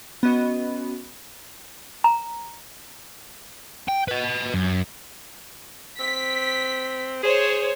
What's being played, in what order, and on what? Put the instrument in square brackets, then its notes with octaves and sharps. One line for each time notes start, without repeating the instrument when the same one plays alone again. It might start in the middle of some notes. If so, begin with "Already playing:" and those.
[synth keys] B3 C#4 F#4 D#5
[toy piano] A#5
[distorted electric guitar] G5
B4 D#5
F#2
[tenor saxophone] C4 [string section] B6
[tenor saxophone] G#4 [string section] C5 C#5